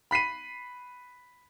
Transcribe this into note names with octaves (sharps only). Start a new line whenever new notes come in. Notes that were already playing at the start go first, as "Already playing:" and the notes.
B5 B6 C7 D#7